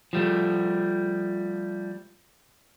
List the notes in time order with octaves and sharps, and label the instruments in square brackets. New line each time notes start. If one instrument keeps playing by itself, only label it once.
[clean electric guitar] F3 G3 A3